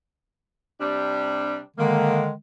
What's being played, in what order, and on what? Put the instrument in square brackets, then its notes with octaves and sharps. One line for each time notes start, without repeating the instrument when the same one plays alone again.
[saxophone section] C3 G3 D4
[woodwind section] D3 D#3 G#3 [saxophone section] A#3